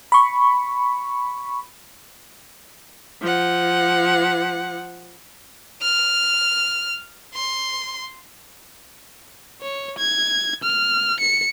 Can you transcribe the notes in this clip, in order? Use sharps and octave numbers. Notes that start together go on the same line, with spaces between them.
B5 C#6
F3 F#5
F6
C6
C#5
G#6
F6
C#7